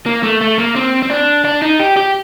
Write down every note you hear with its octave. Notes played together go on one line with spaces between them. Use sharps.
A#3
A3
A3
A#3
C4
C4
D4
D4
D#4
G4
G4